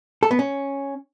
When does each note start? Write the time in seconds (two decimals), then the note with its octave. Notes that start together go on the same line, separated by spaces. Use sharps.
0.23 A4
0.31 B3
0.39 C#4